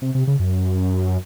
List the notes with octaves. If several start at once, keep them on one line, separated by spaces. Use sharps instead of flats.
C3
C3
C#3
F#2